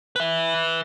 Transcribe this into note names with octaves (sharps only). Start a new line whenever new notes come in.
B4 E5